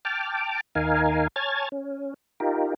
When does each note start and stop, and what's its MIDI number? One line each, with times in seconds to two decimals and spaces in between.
0.05 0.61 79
0.05 0.61 81
0.05 0.61 86
0.05 0.61 89
0.75 1.28 39
0.75 1.28 63
0.75 1.28 70
0.75 1.28 77
0.75 1.28 80
1.36 1.69 73
1.36 1.69 80
1.36 1.69 81
1.36 1.69 89
1.36 1.69 92
1.36 1.69 93
1.72 2.14 61
2.40 2.74 63
2.40 2.74 65
2.40 2.74 67
2.40 2.74 70